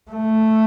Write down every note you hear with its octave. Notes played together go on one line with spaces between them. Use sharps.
A3